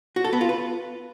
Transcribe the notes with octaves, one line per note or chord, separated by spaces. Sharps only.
F#4
A4
B3
F4
B4